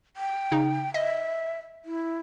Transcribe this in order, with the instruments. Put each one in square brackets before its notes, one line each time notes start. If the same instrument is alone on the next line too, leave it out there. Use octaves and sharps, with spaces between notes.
[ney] G5
[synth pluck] C#3 D#4
[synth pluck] D#5 [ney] E5
[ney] E4